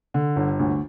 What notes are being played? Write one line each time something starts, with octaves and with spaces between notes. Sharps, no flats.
D3
G1
D2